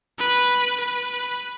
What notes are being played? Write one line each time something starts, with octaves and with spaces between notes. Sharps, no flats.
B4
B4